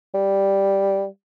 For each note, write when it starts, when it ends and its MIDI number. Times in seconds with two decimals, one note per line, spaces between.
0.14 1.06 55